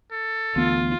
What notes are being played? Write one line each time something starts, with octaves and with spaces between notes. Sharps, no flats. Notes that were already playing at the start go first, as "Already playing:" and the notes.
A4
D2 E3 B3 F4